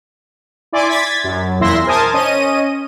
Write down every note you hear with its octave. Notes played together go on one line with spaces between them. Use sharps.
E4 D5 G#5 C6 D6
G#6 A6 B6
F#2
E2 A#2 E4 E5 C6 A#6
A#4 C5 G#5 A5 D#6
C#4 D#5 D#7